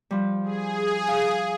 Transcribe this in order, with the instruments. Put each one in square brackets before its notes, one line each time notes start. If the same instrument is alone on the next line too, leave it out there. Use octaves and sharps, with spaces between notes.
[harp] F3 G3
[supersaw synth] G#4
[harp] F5 G#5